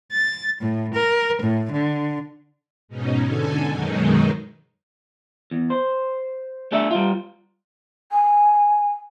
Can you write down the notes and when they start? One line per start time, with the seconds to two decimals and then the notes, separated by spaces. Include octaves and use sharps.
0.12 A6
0.60 A2
0.94 A#4
1.42 A2
1.73 D3
2.88 G#2 B2 C#4 D#4
3.23 D3 A4 G#5
3.69 F#2 B2 D#3 F#3 G#3 D#4
5.51 E2
5.70 C5
6.72 A3 D4 G#4 A4 E5
6.91 G3 F4
8.11 G#5